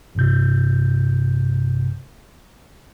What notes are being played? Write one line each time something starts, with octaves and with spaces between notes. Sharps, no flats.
A#1 G2 C3 G6